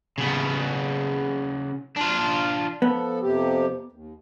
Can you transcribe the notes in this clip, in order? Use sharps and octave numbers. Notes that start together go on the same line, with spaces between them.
C#3 B3
D4 F4
F3 B3 A4
F2 C3 G4
D#2